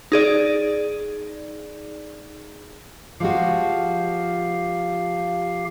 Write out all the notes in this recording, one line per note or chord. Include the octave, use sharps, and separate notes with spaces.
D#4 G#4 D5
F3 G#3 F#4 G4 F5